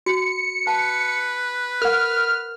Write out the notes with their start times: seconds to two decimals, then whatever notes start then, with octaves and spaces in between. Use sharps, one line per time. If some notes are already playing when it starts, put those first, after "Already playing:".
0.06 F#4 C#7
0.67 B4 A5
1.82 A#4 F#5 F6